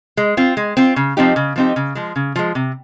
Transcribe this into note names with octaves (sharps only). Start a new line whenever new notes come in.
G#3
C4 F4
G#3
C4 F4
C#3
F3 C4 D#4 G4
C#3
F3 C4 D#4 G4
C#3
F3 G#3
C#3
F3 G#3
C3